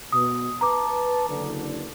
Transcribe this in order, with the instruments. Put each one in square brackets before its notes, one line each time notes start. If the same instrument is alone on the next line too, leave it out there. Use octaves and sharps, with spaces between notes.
[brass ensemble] B2 [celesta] D#6
[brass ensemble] B4 A5 [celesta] A#5 D6
[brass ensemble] F#1 D3